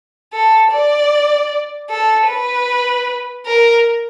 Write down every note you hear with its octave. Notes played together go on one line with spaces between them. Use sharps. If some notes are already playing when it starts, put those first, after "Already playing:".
A4
D5
A4
B4
A#4